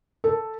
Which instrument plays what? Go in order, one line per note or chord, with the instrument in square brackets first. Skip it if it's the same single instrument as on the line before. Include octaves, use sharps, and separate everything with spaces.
[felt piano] A4